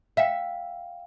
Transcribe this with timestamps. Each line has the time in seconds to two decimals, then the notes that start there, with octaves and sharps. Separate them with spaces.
0.17 E5 F5 G5